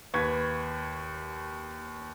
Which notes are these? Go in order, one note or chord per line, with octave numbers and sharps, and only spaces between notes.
D#2 B4 C#6 G#6 B6